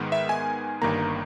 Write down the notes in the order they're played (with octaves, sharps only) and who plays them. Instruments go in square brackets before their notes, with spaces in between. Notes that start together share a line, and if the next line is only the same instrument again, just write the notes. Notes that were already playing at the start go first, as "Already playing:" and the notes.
Already playing: [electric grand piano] G#2 D#3 G#3 B3
E5
G#5
G1 G2 D#3 A#3 A#5